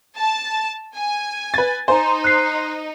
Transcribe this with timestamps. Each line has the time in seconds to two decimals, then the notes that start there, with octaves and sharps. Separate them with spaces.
0.18 A5
0.95 G#5
1.54 B4 A6
1.88 D#4 C5 G#5 A#5
2.24 F#6 C7